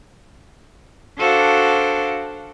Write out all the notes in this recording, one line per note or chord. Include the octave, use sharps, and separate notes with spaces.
D4 F#4 A4 C5 F5